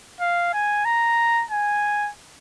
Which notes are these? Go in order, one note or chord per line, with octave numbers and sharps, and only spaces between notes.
F5
G#5
A#5
G#5